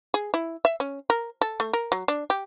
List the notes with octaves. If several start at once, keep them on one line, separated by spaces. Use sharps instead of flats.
G#4
E4
E5
C#4
A#4
A4
A3
A#4
F#3
D4
G4